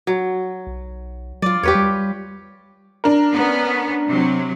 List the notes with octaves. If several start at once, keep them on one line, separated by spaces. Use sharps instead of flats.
F#3
B1
F#3 F4 D5
E2 G4 B4 C#5
G3
D4 A#4
B3 C#4
C3 F#3